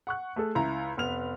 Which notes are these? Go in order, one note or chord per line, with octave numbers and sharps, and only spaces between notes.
F#5 C#6 F#6
A3 G#4 A4
C#2 E4 A#5
F1 B3 F6 F7